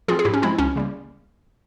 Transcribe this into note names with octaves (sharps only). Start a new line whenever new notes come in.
F3 C4 F4 G#4
G#4
G#2 E4 G4
C#4
F3 G#3 C4 E4
C#2 C#4
C#3 G3 A#3